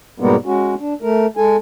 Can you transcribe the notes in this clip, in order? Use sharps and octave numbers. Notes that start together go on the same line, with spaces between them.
G#2 B2 G3 G#3 A#3 B3
G#3 C#4 F#4
D4
A3 A#4
G#3 A4 G#5